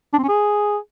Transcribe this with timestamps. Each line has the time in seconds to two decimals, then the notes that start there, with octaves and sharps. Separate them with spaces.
0.13 D4
0.18 C4
0.23 C#4
0.28 G#4